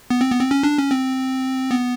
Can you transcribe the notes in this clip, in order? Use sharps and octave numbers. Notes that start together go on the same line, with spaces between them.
B3
C4
B3
C4
C#4
D4
C#4
C4
B3